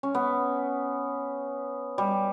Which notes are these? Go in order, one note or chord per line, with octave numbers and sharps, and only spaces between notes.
C#4
B3
G3